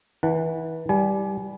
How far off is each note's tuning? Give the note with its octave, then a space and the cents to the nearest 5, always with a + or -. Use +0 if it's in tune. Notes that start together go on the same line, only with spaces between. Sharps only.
E3 -25 F#5 +0 A5 +25
G3 +0 G#5 +35